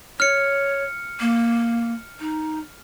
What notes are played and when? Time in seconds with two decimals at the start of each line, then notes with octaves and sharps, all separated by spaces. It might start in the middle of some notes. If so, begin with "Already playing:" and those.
0.20 C#5 F6 C#7
1.20 A#3
2.20 D#4